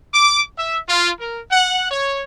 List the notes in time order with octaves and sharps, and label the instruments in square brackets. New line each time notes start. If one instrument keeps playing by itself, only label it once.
[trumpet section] D6
E5
F4
A#4
F#5
C#5